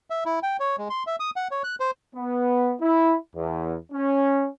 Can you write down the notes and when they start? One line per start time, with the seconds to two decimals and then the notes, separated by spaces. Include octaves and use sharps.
0.10 E5
0.26 E4
0.43 G5
0.60 C#5
0.78 G#3
0.90 C6
1.07 E5
1.20 D#6
1.36 F#5
1.51 C#5
1.64 F#6
1.80 C5
2.15 B3
2.81 E4
3.35 E2
3.92 C#4